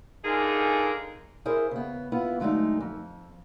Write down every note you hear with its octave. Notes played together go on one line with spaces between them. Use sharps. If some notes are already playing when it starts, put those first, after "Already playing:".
D3 D#4 F4 G#4 A#4 G#5
E4 G#4 A#4 C5
C#3 B3
B3 E4 F4
D3 F#3 G#3 A3 D#4
F2